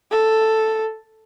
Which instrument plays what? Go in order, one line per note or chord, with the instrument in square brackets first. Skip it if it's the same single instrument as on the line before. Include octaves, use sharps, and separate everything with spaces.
[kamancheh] A4